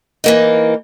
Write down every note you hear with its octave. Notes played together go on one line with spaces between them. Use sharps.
E3 A#3 D#4